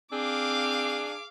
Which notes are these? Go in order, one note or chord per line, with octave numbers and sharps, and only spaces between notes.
C4 D4 G#4 F5 D6